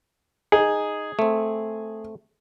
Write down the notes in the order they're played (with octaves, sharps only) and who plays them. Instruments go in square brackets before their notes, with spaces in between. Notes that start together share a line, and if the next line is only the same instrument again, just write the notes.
[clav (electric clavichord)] D#4 [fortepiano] G#4
[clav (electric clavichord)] A3 C4